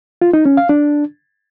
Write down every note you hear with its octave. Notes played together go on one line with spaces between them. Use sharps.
F4
D#4
C#4
F5
D4